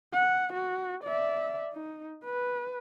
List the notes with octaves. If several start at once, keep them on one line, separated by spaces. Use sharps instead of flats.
F#5
F#4
D5 E5
D#4
B4